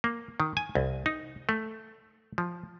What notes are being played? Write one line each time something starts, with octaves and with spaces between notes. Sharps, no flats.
A#3
D#3
G#5
C2
D#4
A3
F3